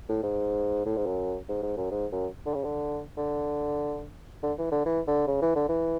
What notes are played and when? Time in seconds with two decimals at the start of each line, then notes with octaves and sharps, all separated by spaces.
0.09 A2
0.23 G#2
0.86 A2
0.97 G#2
1.06 F#2
1.49 G#2
1.63 G#2
1.77 F#2
1.91 G#2
2.12 F#2
2.46 D3
2.55 C#3
2.64 D3
3.17 D3
4.43 D3
4.58 E3
4.72 D3
4.86 E3
5.07 D3
5.27 C#3
5.42 E3
5.55 D3
5.69 E3